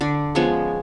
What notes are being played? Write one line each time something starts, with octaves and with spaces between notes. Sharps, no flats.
D3 D4 D5
F3 G#3 B3 C#4 C#5